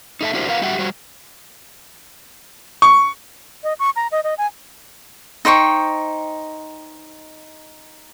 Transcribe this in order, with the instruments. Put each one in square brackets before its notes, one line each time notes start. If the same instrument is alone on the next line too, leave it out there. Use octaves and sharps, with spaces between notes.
[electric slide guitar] D#4 A4 E5 A5
D4 E4 F#4 G4 A#4 C5
F4 A#4 B4 F5 F#5
G3 F#4 G4 E5 F#5
G3 F#4 C5
[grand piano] C#6
[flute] D#5
C#6
A#5
D#5
D#5
G#5
[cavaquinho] D#4 C5 G5 C#6